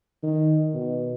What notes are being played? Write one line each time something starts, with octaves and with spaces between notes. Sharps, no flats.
D#3
B2